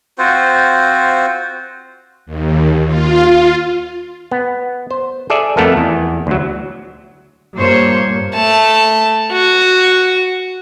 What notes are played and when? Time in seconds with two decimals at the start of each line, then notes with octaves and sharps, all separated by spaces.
0.18 C4 F4 F#4 C5
2.26 D#2
2.87 F4
4.32 B3
4.91 C5
5.30 G#4 A4 D5 E5
5.57 F2 A3 B3 A4 A#4
5.77 E2
6.27 D2 F#3
7.56 G2 A#2 A#3 C5 C#5
8.35 A3 A5
9.32 F#4